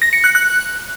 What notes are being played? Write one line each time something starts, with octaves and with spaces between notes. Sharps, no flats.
A#6
C#7
F#6
F#6